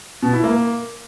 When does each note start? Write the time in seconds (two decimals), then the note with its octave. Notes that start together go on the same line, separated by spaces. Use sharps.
0.23 B2
0.33 E4
0.44 A#3